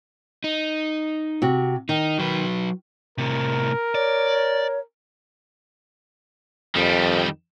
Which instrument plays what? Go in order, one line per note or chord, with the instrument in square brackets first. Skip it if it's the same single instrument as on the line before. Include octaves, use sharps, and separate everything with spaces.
[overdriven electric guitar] D#4
[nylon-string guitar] C3 F#4
[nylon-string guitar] D#3 [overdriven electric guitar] D#4
[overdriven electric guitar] F#3 B4
[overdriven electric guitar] A2 C3 [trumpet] A#4
[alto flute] C#5 [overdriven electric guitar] D5
[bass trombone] F2 [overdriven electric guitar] D#3 G3